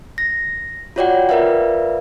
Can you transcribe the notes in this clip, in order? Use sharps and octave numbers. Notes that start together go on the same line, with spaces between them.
A#6
F4 F#4 C#5 D5 F#5 G5
F4 A#4 B4 D5 E5 F5